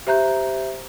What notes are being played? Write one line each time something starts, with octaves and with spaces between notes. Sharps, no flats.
G4 C5 E5 A#5 F#6 G6